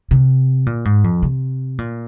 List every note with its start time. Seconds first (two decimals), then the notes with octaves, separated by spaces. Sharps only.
0.11 C3
0.66 A#2
0.85 G#2
1.04 F2
1.23 C3
1.78 A#2